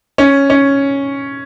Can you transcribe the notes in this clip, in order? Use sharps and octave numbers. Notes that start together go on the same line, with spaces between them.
C#4
C#4